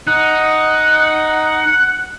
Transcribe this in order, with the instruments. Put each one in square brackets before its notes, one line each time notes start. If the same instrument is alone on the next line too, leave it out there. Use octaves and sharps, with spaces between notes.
[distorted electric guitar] D#4 [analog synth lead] F#5